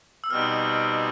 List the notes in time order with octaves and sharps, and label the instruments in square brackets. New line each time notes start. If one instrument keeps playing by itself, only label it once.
[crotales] E6
[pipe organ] B2 G3 C4 D#4 [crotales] F6